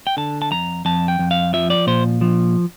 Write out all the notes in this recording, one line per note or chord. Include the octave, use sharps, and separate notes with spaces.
G5
D3 A5
A5
F2 A#5
F2 A5
G5
F2
F5
F3 E5
D5
A#2 C5
F3